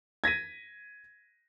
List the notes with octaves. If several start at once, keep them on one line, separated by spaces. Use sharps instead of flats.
G#6 A#6 B6 D#7